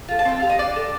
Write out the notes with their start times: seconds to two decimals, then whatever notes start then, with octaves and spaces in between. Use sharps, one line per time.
0.08 F4 A4
0.19 A5
0.25 C4 G5
0.40 G4 F5
0.49 D#5
0.59 D4 D5
0.76 A4